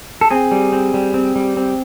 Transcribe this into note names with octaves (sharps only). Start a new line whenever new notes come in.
A4
C4 G#4
G3
C4
G3
C4
G3
C4